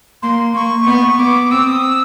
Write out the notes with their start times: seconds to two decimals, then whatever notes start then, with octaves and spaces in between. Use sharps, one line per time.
0.22 A#3 C6
0.54 A#3 C#6
0.86 B3
1.19 B3 D6
1.51 C4 E6
1.67 D#6
1.82 E6